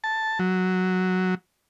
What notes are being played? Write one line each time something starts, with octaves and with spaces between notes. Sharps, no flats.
A5
F#3